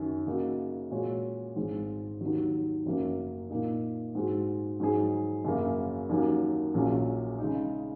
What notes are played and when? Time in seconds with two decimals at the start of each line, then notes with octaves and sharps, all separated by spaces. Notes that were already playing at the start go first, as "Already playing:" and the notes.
Already playing: F#2 D#3 F#3 C#4
0.26 C#3 A#3 D#4 F#4
0.91 A#2 G#3 F#4 C#5
1.56 G#1 G#2 G#3
2.21 D#2 D#3 F#3
2.86 F#1 F#2 F#3 A#3
3.50 A#2 A#3 D#4
4.15 G#2 G#3 F#4
4.80 G#2 F#3 D#4 G#4
5.45 F#2 C#3 F#3 A#3
6.09 D#2 D#3 F#3 A#3 C#4
6.74 A#1 A#2 F#3 C#4 G#4
7.39 C#3 G#3 D#4